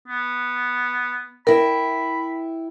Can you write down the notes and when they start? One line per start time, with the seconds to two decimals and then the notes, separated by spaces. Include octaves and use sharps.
0.08 B3
1.47 E4 A#4 G5 B5